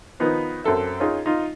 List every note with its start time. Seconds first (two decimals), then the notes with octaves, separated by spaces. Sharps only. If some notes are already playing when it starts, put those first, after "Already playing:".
0.20 D#3 F3 B3 D#4 B4
0.64 F#2 C4 A4 E5
1.00 C#4 D#4 F4 G#4
1.26 D#4 F4